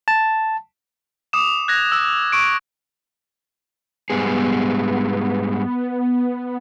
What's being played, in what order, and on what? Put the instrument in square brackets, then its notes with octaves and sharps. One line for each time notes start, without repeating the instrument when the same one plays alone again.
[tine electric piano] A5
[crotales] D6 D#6 E7
F#6 G#6 A#6
E6
C#6 D7
[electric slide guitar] G#2 G3 G#4 [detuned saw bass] B3